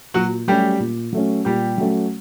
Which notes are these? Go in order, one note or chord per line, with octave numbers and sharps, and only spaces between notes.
A#2 F#3 F#4
F#3 G3 A3 C#4 G4
A#2
F#3 A3 C#4
A#2 G3 G4
F#3 A3 C#4